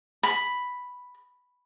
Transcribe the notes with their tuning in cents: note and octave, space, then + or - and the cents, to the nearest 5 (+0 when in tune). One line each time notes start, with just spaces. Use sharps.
B5 +0